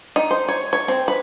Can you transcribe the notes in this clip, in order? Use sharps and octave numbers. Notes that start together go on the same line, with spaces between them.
D#4
C5
C#5
C#5
C4
B4